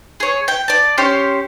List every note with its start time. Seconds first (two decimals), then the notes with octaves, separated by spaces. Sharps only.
0.20 G#4 C#5
0.48 G5
0.68 D5 A5
0.98 C#4 G4 C5 C#5